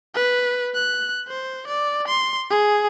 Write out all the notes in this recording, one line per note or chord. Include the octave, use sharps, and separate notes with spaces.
B4
F#6
C5
D5
C6
G#4